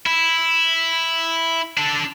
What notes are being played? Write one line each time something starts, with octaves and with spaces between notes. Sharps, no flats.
E4
D4 A4